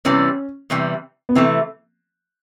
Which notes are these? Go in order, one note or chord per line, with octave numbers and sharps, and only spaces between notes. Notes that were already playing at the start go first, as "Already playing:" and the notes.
E2 C3 E3 G3 C#4
E2 C3 E3 G3
B3
C3 E3 A3 C4